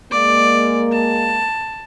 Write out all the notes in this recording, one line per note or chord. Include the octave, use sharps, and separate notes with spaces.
G#3 A#3 D5
A5